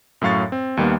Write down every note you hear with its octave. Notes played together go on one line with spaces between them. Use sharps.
F#2 A2 F#3 F5 C#6 A6
C4
D#2 D#3 G3 A#3 B3